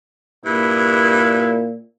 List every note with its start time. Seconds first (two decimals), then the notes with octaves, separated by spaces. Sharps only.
0.45 G2 A#2 E4